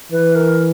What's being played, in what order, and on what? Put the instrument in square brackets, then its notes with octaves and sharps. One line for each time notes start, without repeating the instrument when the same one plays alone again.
[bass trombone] E3 [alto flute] B4
[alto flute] A#4